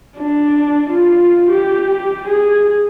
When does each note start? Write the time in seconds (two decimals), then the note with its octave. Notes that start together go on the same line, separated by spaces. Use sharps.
0.18 D4
0.90 F4
1.50 G4
2.28 G#4